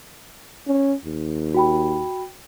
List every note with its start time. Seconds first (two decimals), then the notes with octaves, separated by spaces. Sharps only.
0.68 C#4
1.05 D#2
1.54 F#4 G5 B5